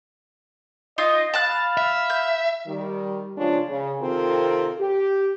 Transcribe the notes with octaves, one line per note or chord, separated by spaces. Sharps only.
D#4 F4 D#5 D#6
F5 A5 B5 F#6
E5
G6
D#3 G3
C#3 F3 G#3 D4 F4 C#5
C#3
C3 D#3 C4 F4 A4 A#4
G4